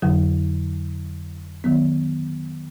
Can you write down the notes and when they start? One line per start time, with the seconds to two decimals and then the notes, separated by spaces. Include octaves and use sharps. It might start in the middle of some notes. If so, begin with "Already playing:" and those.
0.02 F2 D3 F#3
1.64 D#3 F#3 B3